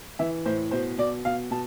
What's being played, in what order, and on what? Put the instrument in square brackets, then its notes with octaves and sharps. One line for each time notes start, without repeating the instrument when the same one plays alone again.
[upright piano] E3 E5
A2 C5
B2 C5
B2 D5
B2 F5
B2 A5